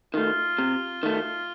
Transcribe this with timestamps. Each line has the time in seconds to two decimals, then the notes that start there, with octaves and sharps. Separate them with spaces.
0.14 D#3 A3 F4
0.58 C3
1.03 D#3 A3